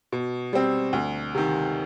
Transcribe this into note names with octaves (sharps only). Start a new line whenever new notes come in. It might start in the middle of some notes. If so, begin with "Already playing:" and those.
B2
G3 C4
D2
C3 D#3